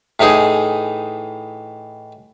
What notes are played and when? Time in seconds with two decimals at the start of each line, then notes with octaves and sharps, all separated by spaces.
0.20 A2 E3 D#4 G#4